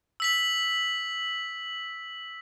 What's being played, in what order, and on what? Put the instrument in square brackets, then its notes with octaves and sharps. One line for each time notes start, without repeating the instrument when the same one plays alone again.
[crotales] E6 B6 F#7